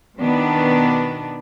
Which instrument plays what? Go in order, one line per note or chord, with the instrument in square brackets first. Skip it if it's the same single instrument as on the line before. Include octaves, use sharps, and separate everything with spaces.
[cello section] B2 D#3 B3 D4